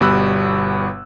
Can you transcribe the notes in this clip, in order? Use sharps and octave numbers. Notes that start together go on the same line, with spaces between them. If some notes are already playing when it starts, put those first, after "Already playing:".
G1 B2 G3 B5 E6 F#6